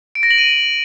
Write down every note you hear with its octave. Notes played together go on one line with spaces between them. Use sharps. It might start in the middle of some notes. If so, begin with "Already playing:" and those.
D7
A#6
F#7
D#7